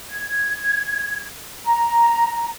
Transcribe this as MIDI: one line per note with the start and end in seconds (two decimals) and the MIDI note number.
0.10 1.25 92
1.65 2.50 82